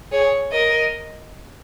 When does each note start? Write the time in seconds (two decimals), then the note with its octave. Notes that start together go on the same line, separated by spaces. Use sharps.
0.11 G#4 C#5
0.52 A#4 D#5